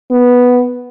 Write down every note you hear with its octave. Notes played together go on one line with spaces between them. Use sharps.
B3